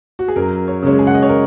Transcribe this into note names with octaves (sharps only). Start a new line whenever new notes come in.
F#4
G#4
F#2 A#4
C#5
C#3 G#3 C#4
G#4
F#5
D#5
C#5
A#4